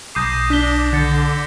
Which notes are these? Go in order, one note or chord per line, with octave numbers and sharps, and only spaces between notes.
B1 D6 D#6 G6 A#6 C7
D4 A#6 B6 G7
D3 G6 A6 C#7